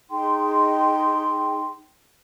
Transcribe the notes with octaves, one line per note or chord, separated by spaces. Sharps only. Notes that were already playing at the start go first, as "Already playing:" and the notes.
D#4 G#4 G5 C6